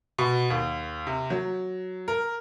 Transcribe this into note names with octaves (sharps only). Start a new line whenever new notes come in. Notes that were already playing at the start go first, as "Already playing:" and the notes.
B2
D#2
C3
F#3
A#4